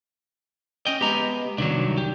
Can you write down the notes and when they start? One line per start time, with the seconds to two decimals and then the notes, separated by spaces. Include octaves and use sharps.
0.87 C#4 D#5 G5
1.01 G#3 B3 G4 A#5
1.58 C2 D#3 F#3 D4
1.98 G4